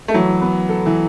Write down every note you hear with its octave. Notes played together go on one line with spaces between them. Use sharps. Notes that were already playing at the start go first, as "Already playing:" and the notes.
A3
E3 F#3
B3
A4
E3